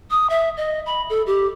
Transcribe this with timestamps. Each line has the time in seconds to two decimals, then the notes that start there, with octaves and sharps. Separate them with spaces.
0.11 D#6
0.30 E5
0.57 D#5
0.86 B5
1.10 A4
1.27 G4